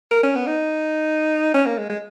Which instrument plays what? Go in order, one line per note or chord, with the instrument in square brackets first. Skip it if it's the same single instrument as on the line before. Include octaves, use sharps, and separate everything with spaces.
[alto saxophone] A#4
C#4
B3
D#4
C#4
A#3
G#3
G#3